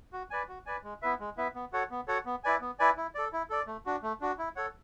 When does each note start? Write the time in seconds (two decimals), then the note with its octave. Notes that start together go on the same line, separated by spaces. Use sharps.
0.13 F#4
0.31 B4 D5 G#5
0.49 F#4
0.66 B4 D5 G#5
0.84 G#3
1.02 B3 E4 B4 E5
1.20 G#3
1.37 B3 E4 B4 E5
1.55 B3
1.73 F#4 A4 C#5 F#5
1.91 B3
2.08 F#4 A4 C#5 F#5
2.26 B3
2.44 E4 B4 D5 G#5
2.61 B3
2.79 E4 B4 D5 G#5
2.97 E4
3.15 A4 D5
3.33 E4
3.50 A4 D5
3.67 A3
3.86 D4 F#4
4.03 A3
4.21 D4 F#4
4.39 E4
4.56 A4 C#5 F#5